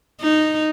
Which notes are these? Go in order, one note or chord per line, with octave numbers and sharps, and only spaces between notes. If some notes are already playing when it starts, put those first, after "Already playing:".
D#4